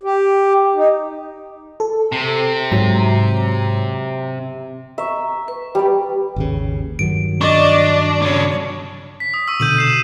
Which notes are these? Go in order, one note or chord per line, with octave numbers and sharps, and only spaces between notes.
G4
D#4
A4
C3
G#2 F#3 A#5
E5 A#5 C#6
B4
G3 D5
G#1 D#2 C#3
G2 D#3 F#3 D7
D4 D5 D#5 C#6
C#3 D4 C#5
B6
D#6
C#6 E6
B2 D3 G6 D#7 F#7
C7 E7